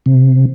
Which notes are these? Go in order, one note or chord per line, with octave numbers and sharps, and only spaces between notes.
C3